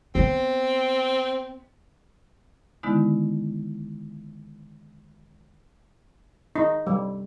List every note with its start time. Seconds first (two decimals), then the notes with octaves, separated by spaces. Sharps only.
0.15 B3 C4
2.83 D3 D#3 G#3 B3 D#4 E4
6.56 D#4
6.87 G3